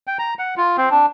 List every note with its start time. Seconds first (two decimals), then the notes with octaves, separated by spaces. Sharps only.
0.07 G5
0.19 A#5
0.39 F#5
0.57 F4
0.78 C4
0.91 D4